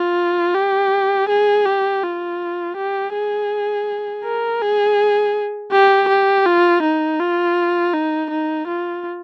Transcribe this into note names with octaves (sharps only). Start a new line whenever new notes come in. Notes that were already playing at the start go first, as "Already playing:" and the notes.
Already playing: F4
G4
G#4
G4
F4
G4
G#4
A#4
G#4
G4
G4
F4
D#4
F4
D#4
D#4
F4